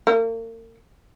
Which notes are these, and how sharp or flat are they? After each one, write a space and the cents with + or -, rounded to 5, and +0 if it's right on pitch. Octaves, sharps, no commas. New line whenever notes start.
A#3 -40